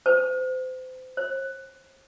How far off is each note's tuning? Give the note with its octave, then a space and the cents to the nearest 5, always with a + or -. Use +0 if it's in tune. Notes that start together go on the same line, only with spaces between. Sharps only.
C5 -30
C5 +45